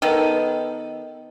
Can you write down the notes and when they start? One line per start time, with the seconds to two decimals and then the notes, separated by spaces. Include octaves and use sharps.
0.02 D#3 B3 A4